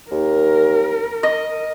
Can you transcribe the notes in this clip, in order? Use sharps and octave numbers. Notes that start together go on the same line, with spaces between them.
D#2 A#4
D#5